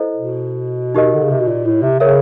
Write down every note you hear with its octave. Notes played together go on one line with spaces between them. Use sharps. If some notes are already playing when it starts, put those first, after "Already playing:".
Already playing: E4 A4 C5 D#5
B2
D#4 G4 A#4 D#5
D3
C#3
C3
B2
A#2
A2
C3
C#3 A#4 C#5 E5